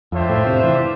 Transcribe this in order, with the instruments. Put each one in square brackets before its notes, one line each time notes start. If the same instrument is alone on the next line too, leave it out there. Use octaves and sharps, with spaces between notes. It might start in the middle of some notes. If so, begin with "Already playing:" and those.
[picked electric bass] F2 [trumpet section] D4 F4 C5 E5 G5
[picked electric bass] A2
C3
E3